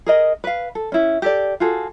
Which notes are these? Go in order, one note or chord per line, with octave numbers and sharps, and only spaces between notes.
G#4 A#4 D#5
B4 F5
A4
C#4 E4
G4 A4 D5
F4 F#4 G#4 A4